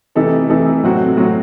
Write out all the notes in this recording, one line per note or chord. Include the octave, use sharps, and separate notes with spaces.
C3 E3 A3 D#4 A4
C3 E3 A3 D#4 A4
A2 F#3 C4 F#4
A2 F#3 C4 F#4